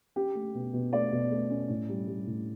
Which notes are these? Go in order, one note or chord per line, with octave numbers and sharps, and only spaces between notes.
C#4 G4
A3
B2
B2
A3 D5
B2
A3
C#4
A2
G3
G3
A2